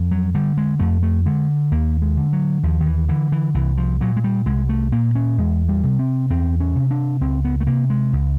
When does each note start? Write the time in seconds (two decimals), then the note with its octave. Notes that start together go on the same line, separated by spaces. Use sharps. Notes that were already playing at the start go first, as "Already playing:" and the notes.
Already playing: F2
0.11 F#3
0.35 D3 G3
0.57 G#3
0.80 F2 A3
1.03 A3
1.26 D3 G#3
1.72 D#2 A#3
2.02 G#3
2.17 D3
2.33 F#3
2.63 D#2 F3
2.81 D#3
2.86 E3
3.09 D3 E3
3.32 E3
3.54 C2 E3
3.77 F3
4.01 A#2 F#3
4.16 G#3
4.24 G3
4.46 C2 G#3
4.69 A3
4.92 A#2 A#3
5.15 C#4
5.38 E2 G#3
5.69 G3
5.83 C3
5.99 C4
6.30 E2 C4
6.60 C#4
6.75 C3
6.91 D4
7.21 C#2 C4
7.45 B3
7.60 A3
7.67 C3 A#3
7.90 G#3
8.13 C#2